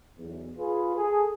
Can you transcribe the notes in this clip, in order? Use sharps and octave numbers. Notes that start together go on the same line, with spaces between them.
B1 E2
F4 G#4 B4
G#4 A4